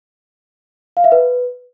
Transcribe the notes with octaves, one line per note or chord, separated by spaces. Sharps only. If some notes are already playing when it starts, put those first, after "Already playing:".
F5
E5
B4